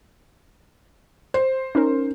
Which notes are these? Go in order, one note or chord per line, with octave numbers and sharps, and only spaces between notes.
C5
C#4 D#4 A#4